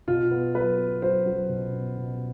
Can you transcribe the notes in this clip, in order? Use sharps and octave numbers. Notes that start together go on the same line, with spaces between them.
B2 F4
B3
F#3 B4
B3
F#3 C5
F#3
B2
B3
B2